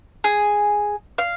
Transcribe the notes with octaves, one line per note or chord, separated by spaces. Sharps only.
G#4
F5